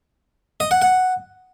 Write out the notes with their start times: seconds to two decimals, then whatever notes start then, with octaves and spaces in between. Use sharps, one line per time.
0.60 D#5
0.71 F#5
0.82 F#5